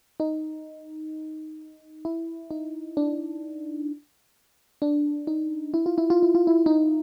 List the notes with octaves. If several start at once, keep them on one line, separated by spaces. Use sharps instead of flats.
D#4
E4
D#4
D4
D4
D#4
E4
F4
E4
F4
E4
F4
E4
D#4